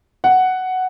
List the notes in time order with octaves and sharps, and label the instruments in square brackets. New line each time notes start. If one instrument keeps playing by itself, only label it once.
[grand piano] F#5